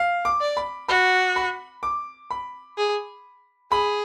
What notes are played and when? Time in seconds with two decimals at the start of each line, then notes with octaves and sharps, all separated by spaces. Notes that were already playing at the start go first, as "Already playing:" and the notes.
Already playing: F5
0.25 D6
0.41 D5
0.57 B5
0.88 F#4 B5
1.36 B5
1.83 D6
2.31 B5
2.77 G#4
3.71 G#4 B5